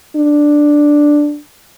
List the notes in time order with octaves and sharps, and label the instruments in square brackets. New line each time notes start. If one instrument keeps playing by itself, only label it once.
[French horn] D4